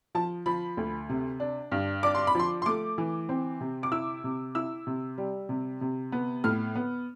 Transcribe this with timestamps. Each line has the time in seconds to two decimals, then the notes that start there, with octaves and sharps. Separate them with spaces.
0.15 F3 A5
0.46 F3 B5
0.77 D2
1.09 C3
1.40 D4
1.72 G2
2.03 D4 D6
2.15 C6
2.27 B5
2.35 F3 C6
2.62 C6
2.66 A3 D6
2.98 E3
3.29 C4
3.61 C3
3.83 D6
3.92 E4 E6
4.24 C3
4.55 E4 E6
4.87 C3
5.18 G3
5.49 C3
5.81 C3
6.12 B3
6.44 A2 F6
6.75 B3